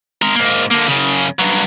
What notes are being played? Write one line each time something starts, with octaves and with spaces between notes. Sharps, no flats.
G#3 A#4
G#2 A#3
D3 A#3
F#2 C#3
G2 F#3